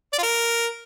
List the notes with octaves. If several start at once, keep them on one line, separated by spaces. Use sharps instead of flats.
D5
F4
A#4